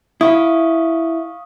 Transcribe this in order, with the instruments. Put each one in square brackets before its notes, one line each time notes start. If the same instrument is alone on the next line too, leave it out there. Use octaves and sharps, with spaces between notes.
[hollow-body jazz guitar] E4 [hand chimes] F5 C#6 D#6